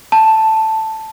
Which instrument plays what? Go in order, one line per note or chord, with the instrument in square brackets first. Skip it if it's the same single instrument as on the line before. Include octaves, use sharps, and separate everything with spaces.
[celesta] A5